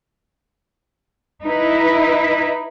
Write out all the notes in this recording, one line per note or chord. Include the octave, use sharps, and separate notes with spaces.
D#4 E4 B4